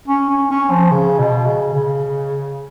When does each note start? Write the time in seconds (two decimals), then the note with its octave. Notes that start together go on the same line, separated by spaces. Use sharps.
0.08 C#4
0.29 C#4
0.51 C#4
0.71 F3
0.91 C#3
1.19 B2
1.46 C#3
1.74 C#3